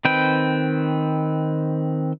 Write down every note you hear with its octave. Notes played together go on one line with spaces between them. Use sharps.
D#3 C4 B4 G5